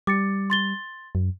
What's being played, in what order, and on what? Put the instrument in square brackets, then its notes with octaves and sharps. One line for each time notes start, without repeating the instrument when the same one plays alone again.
[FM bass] G3 [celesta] D6 A6 C#7
[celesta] C6 A6 G7
[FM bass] F#2